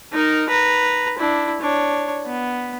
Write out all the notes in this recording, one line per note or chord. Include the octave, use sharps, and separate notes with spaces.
D#4 A#4
B4 A#5
D4 E4
D4 C#5
B3